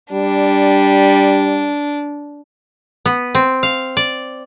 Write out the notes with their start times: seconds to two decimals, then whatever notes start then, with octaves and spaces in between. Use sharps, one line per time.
0.13 G3 D4
3.06 B3
3.35 C4
3.63 F5
3.97 D5